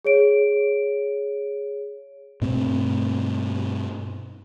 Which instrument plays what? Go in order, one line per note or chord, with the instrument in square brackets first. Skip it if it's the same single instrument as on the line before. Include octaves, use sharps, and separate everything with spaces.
[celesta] G#4 C#5 D7
[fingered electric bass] G2 B2 A3 C4